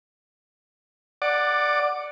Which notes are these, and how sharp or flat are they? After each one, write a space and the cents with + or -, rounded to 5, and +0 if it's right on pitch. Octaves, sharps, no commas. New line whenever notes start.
D5 +5 F#5 +0 D6 +25